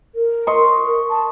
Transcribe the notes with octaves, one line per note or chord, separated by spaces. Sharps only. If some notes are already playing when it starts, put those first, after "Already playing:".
A#4
D#5 C6 C#6
A5